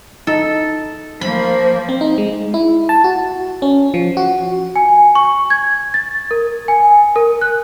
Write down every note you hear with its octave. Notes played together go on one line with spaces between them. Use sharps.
D#4 A4
F3 A#3 C5 B5
C4
D#4
G#3
E4
A5
F#4
C#4
F3
F#4
G#5
C#6
G#6
A6
A#4
G#5
A#4
F#6